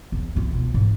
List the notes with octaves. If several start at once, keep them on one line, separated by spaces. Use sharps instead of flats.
E2
B3 F4
B2 B3
G#2